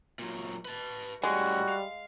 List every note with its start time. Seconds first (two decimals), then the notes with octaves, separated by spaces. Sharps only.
0.19 A#2 F#3
0.65 B4 A5
1.23 A2 G3 G#3 C#4 F#4
1.69 F5